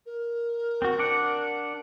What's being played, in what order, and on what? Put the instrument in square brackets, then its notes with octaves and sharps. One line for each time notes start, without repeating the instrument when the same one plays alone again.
[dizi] A#4
[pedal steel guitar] C4 F#4
D4 D5 F#5